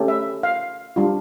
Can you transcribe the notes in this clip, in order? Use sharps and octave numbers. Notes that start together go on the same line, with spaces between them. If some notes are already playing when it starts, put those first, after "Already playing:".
Already playing: A3 C#4 G4
E5
F5
G3 D4 F4